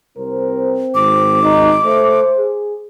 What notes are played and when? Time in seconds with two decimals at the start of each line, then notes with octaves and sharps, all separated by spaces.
0.18 C2 C4 A#4 C5
0.95 G#1 D6
1.43 D#4
1.85 A3 C5
2.38 G#4